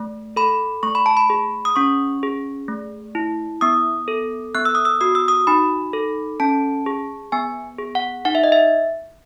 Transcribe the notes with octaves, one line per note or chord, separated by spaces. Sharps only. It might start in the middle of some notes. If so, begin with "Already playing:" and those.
Already playing: A3
A4 B5
A3 C#6
B5
A5
B5
G#4
D#6
C#4 C#6
G#4
A3
E4
B3 D#6
A4
B3 F#6
E6
D#6
E6
F#4 D#6
E6
D#6
D#4 B5
A4
C#4 A5
G#4
B3 G#5
G#4
F#5
D#4 F#5
E5
D#5
E5